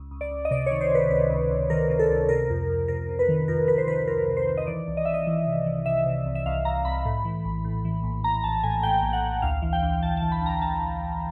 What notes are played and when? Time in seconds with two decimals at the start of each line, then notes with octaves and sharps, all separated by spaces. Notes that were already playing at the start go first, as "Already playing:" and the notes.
Already playing: C#2
0.11 C#2
0.21 D5
0.31 C#2
0.45 D#5
0.51 C3 D5
0.66 D#3 C#5
0.81 C5
0.91 C3 B4
1.10 C#2 B4
1.30 C#2
1.50 C#2
1.70 D#3 A#4
1.90 C3
1.99 A4
2.10 C#2
2.29 C3 A#4
2.50 F2
2.70 F2
2.88 C3 A#4
3.09 C3
3.19 B4
3.29 D#3
3.48 F2 A#4
3.67 F2 B4
3.78 C5
3.87 D#3 B4
4.08 F2 A#4
4.28 C3
4.37 C5
4.47 D#3
4.57 D#5
4.67 E3 D5
4.87 C2
4.97 D#5
5.05 C2 E5
5.14 D#5
5.27 E3
5.47 C3
5.66 E3
5.86 C3 E5
6.06 C3
6.26 C2
6.35 E5
6.46 C2 F5
6.65 C2 A#5
6.85 C2 B5
7.05 A2
7.25 E3
7.45 A#1
7.65 A2
7.85 E3
8.03 A#1
8.24 A#1 A#5
8.44 A#1 A5
8.63 A2 G#5
8.83 A2 G5
9.02 A#1
9.13 F#5
9.23 A#1
9.42 D2 F5
9.62 E3
9.73 G5
9.82 D2
10.02 E3 A5
10.17 E3 A5
10.32 B5
10.41 D2 A#5
10.61 D2 A5
10.82 D2
11.01 D2